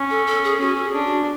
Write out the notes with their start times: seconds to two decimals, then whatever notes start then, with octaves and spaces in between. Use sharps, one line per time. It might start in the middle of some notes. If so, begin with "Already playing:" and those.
Already playing: C#4
0.10 A4
0.27 A4
0.44 G#4
0.61 C#4 F#4
0.76 A4
0.84 G#4
0.94 D4
1.06 F#4